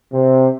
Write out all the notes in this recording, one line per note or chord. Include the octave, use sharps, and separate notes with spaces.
C3